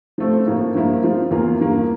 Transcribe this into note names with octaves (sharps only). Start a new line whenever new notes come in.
F3 A3 C4
A2 F3 A#3
G2 F3 A#3 E4
F3 C4 F4
E2 E3 A#3 F4
G2 E3 A#3